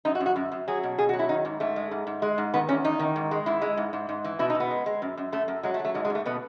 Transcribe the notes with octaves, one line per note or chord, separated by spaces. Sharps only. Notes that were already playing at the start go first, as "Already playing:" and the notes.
F#2 D#4
F#4
F#2
F#4
F#2
F#2
F#3 G#4
B2
B2 G#4
F#4
F#3
E4
D#3 D#4
G#2
G#2 A3
G#3
G#2
G#2
G#3
G#2
D#3 B3
E2 C#4
E2 D#4
D#3
G#2
G#3
G#2 E4
G#3
G#2
G#2
G#2
E3
B2 E4
D#4
B2
B3
G#3
G#3
F#2
F#2
F#2 A3
F#2
F#3 G#3
A3
F#3
A3
G#2 G#3
G#3
G#2
A3
B2 B3